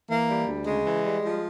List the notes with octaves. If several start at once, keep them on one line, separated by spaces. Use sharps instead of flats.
E3 A#3
G3
D2
C#3 G#3
E3
G3
F3